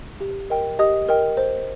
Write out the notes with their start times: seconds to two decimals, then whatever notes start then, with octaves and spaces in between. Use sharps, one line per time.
0.20 G4
0.50 A#4 D#5 G5
0.79 G4 D#5 D#6
1.09 A#4 D#5 G5
1.37 C5